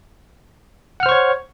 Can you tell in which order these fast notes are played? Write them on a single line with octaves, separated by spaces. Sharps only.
F#5 F6 C5 C#6 C#5